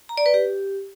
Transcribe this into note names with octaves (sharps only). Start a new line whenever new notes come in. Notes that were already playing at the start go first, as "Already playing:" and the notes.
A#5
D5
B4
G4